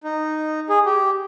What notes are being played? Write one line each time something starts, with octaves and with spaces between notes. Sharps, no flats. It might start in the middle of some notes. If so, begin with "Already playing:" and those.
D#4
G#4
G4